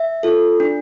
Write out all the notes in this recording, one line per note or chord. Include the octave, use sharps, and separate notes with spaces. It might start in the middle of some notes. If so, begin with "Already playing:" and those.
Already playing: E5
F4 A4
D4